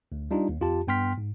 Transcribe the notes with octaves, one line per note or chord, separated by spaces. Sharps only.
D2
G3 D4 D#4 F4
D#2
F2 F4 G4 A5
G2 B3 G5 C6 F6 B6
G#2